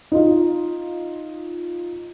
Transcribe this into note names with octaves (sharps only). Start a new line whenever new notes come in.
D#4 F4